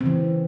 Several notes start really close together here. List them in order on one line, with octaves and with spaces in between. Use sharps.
C4 C#3 E3